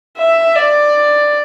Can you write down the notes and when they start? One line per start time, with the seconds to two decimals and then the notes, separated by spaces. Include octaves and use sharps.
0.17 E5
0.55 D5